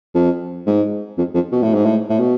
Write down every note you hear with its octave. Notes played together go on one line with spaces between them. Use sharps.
F2
G#2
F2
F2
B2
A2
G#2
A2
A2
B2